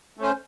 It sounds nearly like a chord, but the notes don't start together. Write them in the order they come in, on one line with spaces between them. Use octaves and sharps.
A3 C#4 C5